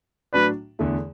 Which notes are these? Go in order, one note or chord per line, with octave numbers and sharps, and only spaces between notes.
A2 F#3 D4 F#4 B4 D5
E2 D3 A3 E4